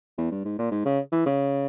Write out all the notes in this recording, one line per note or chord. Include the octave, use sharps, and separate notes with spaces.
E2
G2
G#2
A#2
G#2
C#3
E3
C#3